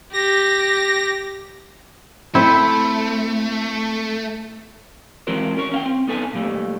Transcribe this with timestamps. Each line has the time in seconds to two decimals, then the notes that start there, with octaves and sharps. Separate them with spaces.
0.13 G4 A#6
2.35 A3 C4 E4
5.27 E3 G#3 C4 F#4 A#4 C5
5.57 C#4 A#4 C#5
5.72 C#4 F5 G5
5.86 C4
6.08 B3 D#4 A4 B4 G#5
6.33 A#2 G3 A3